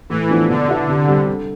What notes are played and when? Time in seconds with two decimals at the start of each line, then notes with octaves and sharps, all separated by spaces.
0.10 A2 E3
0.29 F3 B3 D4
0.49 B2 D3
0.68 B3 E4
0.88 C3
1.08 G3 C4
1.28 D3